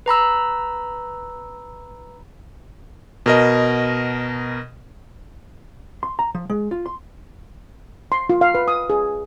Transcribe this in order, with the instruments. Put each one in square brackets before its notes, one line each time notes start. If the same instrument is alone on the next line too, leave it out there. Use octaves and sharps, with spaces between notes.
[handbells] B4 A#5 B5 E6
[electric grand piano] B2 A#4 D#5
[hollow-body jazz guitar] C6
A#5
F3
G#3
F4
C6
[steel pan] C6
F4
F5
B4
D#6
G#4